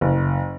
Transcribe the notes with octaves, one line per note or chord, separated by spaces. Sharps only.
F#1